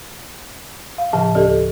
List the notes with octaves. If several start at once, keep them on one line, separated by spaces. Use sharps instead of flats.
F5
A2 C#3 F3 A5
D2 G4 A4